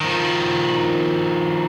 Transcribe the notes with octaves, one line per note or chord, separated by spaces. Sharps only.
D#3 F3